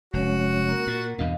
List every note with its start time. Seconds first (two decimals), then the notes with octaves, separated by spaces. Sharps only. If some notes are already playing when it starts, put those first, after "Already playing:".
0.13 F1 G#3 C#4 F#4 C#5
0.69 A#3 A#4 F#5
0.87 A#2
1.18 E2 G2 B2 D#5 F5